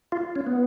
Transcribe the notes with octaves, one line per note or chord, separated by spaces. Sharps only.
F4
C#4
B3